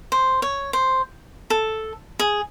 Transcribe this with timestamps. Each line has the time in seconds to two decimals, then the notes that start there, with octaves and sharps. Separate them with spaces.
0.12 C5
0.42 C#5
0.73 C5
1.50 A4
2.19 G#4